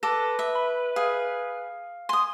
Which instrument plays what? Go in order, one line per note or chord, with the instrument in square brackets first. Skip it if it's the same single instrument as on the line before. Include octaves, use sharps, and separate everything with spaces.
[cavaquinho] A4 [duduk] B4 [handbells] D6 A#6
[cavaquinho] E5
[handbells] B5
[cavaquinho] G#4 [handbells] F5
[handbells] G#5 [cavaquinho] C6 D#6